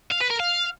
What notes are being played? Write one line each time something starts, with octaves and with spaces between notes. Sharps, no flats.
F5
B4
A#4
F5